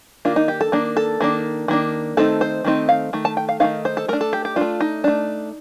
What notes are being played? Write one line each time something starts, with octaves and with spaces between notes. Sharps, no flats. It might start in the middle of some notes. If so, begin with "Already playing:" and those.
D#3 A#3 D4 F4
D#4
G4
A4
D#3 A#3 D4
A4
D#3 A#3 D4
D#3 A#3 D4
D#3 A3 C4 D#4 A4
C5
D#3 A3 C4 D#4
F5
D#3 A3
A5
G5
F5
D#3 A3 C4 D#4 F5
C5
A4
A3 D4 A#4
A4
G4
G4
A3 D4 F4
D#4
A3 D4